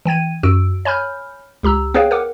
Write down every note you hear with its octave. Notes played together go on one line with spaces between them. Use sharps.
E3 G5 G#6 D#7
F#2 F#4 E6 D7
C#5 G#5 B5 F6 G6
C#2 G4 A#5 E6
B3 G#4 B4 C#5 F5 G5
A#4 B4 F#5 D6